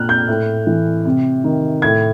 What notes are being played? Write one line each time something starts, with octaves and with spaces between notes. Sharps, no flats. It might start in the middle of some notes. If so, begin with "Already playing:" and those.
Already playing: A#2 F6 F#6
G6
A2
E3
C3
D#3
A2 G#6